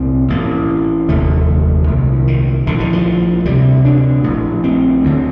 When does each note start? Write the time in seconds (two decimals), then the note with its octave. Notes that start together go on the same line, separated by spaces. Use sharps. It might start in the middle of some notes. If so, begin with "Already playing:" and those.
Already playing: C2 A#2 C4
0.30 A1 A2 A#3
1.09 F1 D#2 D3 A3
1.88 C2 A#2
2.28 D#3
2.67 A#1 A2 D3
2.80 D#3
2.93 F3
3.45 D2 C3 G3
3.85 D4
4.24 A#1 A2
4.64 C4
5.03 D2 D3